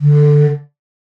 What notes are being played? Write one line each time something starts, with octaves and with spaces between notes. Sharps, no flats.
D3